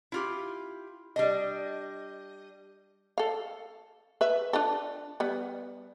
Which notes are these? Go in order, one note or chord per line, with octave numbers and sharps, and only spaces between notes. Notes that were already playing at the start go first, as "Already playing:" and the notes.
E4 F4 G4
G3 D4 D#5
A4 F5
B4 E5
D4 F4 A4
G3 B3